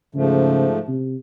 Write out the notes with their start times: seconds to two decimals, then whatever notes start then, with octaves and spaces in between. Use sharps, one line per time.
0.15 G#2 C#3 F3 A3
0.88 C3